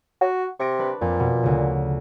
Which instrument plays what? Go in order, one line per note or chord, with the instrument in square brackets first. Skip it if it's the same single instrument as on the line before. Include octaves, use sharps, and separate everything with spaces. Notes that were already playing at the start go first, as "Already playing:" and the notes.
[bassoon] F#4
[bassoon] C3 [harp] C#6 A#6 D7
[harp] D4 B4
[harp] F2 [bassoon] A#2
[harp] B2
D2 C#3